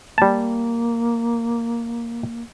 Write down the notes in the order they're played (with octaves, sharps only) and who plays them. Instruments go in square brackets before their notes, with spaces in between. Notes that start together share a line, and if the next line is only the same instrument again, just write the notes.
[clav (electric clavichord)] G3 A5 [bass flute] A#3